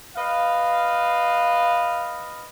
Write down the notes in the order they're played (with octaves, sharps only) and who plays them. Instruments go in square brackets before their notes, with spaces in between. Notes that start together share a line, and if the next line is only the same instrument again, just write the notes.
[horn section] B4 D#5 F5